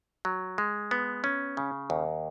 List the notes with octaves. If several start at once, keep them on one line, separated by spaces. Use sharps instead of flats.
F#3
G#3
B3
C#4
C#3
D#2